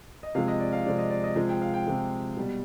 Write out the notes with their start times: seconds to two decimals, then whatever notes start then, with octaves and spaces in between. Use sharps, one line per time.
0.23 D#5
0.35 C3 F3 G#3 F5
0.48 D#5
0.60 D5
0.73 F5
0.85 C3 F3 G#3 D5
0.98 D#5
1.10 D5
1.24 D#5
1.36 C3 F3 G#3
1.49 G5
1.62 F5
1.74 G5
1.86 C3 F3 G#3
2.37 B2 G3